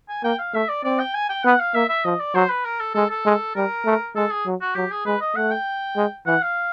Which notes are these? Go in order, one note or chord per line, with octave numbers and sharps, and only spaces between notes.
G#5
A#3 G5
F5
A3 E5
D5
C4 D5
G5
G#5
G5
B3 F#5
F5
A#3 E5
E5
F3 D#5
D5
F#3 C5
B4
A#4
A4
G#3 A4
A4
G#3
G3 A#4
A3
G#3 A4
G#4
F#3
F#4
F#3 G4
G#4
G#3 B4
D#5
A3 F#5
G5
G#3
E3 F#5
F5